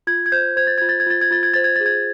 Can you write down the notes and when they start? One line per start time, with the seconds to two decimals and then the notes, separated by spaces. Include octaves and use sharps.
0.07 F4 G#6
0.26 G#6
0.32 C5 G6
0.56 C5 G#6
0.67 A6
0.78 F4 G#6
0.89 A6
1.00 G#6
1.06 F4 A6
1.21 G#6
1.31 F4 A6
1.43 G#6
1.54 C5 A6
1.64 G#6
1.76 G#4 A6
1.86 G#6